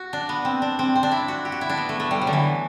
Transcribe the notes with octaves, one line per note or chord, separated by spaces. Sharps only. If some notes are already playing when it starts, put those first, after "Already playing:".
Already playing: F#4
D4
B3
C4
D4
C4
C4
D4
E4
F#4
G4
F#4
E4
D4
B3
A3
A3
G3
F#3
D3
E3